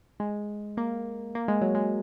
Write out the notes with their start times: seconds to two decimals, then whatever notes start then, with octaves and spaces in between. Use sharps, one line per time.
0.20 G#3
0.77 A#3
1.35 A#3
1.48 G#3
1.61 F#3
1.75 G#3